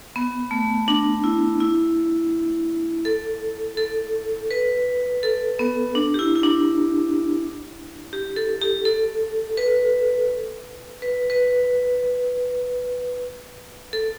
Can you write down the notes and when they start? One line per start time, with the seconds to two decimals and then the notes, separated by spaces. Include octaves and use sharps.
0.16 B3
0.51 A3
0.88 D4
1.24 E4
1.60 E4
3.05 A4
3.77 A4
4.51 B4
5.23 A4
5.59 B3
5.95 D4
6.14 G4
6.19 E4
6.36 E4
6.43 D4
8.13 G4
8.37 A4
8.61 G4
8.85 A4
9.57 B4
11.02 B4
11.30 B4
13.93 A4